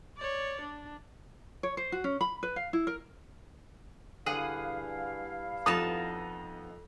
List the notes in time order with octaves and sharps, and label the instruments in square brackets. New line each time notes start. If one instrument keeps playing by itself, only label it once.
[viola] C#5 D5
D4
[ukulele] C#5
C5
F#4
C#4
B5
B4
F5
E4
A#4
[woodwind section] G2 E4 F5 [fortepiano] D3 [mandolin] G#4 F#5 D#6
[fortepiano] F2 F3 [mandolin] B3 D#4 A5 [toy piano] D#6